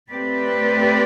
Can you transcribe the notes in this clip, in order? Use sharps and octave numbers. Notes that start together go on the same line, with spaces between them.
A3 C4 G4 B4 D5